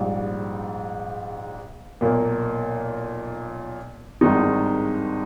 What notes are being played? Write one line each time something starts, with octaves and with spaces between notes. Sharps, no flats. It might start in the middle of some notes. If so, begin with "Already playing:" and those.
Already playing: A#1 G#2 G3
B1 A#2 A#3
G#1 G2 D#3 G#3 D#4